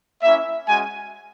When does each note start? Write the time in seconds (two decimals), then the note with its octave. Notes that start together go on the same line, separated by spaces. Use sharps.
0.22 A#3 C#4 E4 E5
0.66 G#3 C#4 F#4 G#5